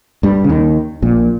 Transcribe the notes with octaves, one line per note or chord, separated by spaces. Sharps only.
G2 G3
C#3
D#2 D#3
A#1 A#2